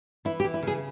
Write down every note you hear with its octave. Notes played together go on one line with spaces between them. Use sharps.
E3 E4
G4
E3
E4
C#3 G#4